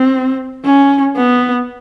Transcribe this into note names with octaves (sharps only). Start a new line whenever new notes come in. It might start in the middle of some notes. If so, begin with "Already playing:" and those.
Already playing: C4
C#4
B3